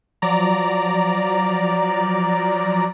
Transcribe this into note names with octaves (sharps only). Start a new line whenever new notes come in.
F3 F#3 D5 A#5